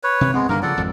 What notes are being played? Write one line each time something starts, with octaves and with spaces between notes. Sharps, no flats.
B4 C#5
C3
G#3 B3 C4
G2 D3 D#3 A#3 A#4
C#3 F3 A4 D5 F#5
G#1 F2